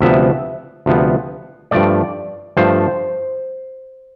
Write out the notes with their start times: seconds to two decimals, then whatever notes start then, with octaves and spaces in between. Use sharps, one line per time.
0.01 D2 C3 F3 B3 E5
0.86 D2 C3 F3 B3
1.71 G2 F3 A3 D5
2.57 G2 F3 A3 C5